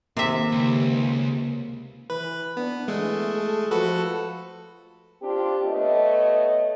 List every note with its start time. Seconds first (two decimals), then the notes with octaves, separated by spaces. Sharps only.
0.17 D#2 C3 A#3 E5
0.52 C#2
2.10 E3 B4
2.57 B3 D4
2.88 E3 G#3 A3
3.36 A4
3.71 F3 F#4 A4 B4
5.22 C4 D4 F4 G4
5.66 A3 B3 C#5 D#5